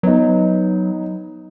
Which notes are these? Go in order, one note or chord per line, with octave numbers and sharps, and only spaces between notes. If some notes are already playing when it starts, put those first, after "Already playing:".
F#3 B3 D#4